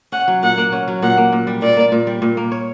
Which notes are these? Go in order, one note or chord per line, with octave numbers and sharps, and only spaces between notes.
C#4 F#5
F#3
A#2 F#5
A#3
C#4
F#3
A#2 F#5
A#3
A#2
G3
A#2 D5
A#3
A#2
G3
A#2
A#3
C#5